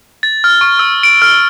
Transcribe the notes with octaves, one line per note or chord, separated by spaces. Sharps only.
A6
F6
C#6
E6
D7
F6